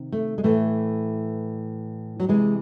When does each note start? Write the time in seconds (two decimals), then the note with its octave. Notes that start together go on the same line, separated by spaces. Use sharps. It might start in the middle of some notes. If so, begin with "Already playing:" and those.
Already playing: C3 D#3
0.12 A3
0.38 G#3
0.44 A2 E3 A3
2.20 F#3
2.29 C3 E3 G#3